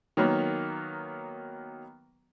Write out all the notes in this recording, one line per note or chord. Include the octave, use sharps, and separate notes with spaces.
D#3 F#3 A#3 B3